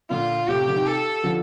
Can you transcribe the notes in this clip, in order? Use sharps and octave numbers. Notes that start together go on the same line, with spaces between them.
A#2 D3 F4
A2 C3 G4
D3
C3 D#3
A4
D3 F3